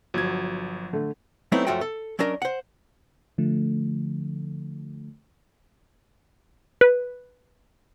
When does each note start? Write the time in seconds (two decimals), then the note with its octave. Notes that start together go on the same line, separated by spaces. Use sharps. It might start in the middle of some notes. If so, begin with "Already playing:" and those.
0.14 G1 F3 F#3 G#6
0.93 D3 A3
1.52 F#3 A3 B3 C4 D#4 E4
1.67 C#2 F#2 F3 A3 F#4 G5
1.81 A4
2.19 F#3 C#4 D4 A#4 D#5
2.42 C5 F#5
3.38 D3 F3 A3
6.81 B4